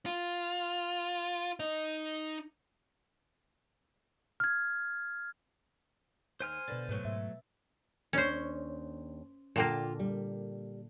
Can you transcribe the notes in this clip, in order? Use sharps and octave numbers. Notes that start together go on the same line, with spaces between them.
F4
D#4 D#5
F6 G#6
D#2 C5 G#5 F6
B2 D3 B4 A6
G#2 F#3 A3 B3
G#2 E5
D#2 C#4 D4 C5 C#5
A#2 D3 A#3 F4 G5 A5
G3